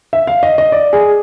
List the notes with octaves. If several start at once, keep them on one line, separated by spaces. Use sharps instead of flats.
E5
F5
D#5
D#5
D5
G#4